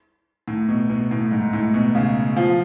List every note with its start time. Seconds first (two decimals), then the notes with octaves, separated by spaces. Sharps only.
0.48 A2
0.69 B2
0.90 B2
1.11 A2
1.31 G#2
1.53 A2
1.74 B2
1.95 C#3
2.37 F3